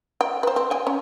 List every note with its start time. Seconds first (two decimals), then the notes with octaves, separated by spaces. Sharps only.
0.21 G5
0.43 B4 C5
0.56 C4
0.71 G5 G#5
0.87 C#4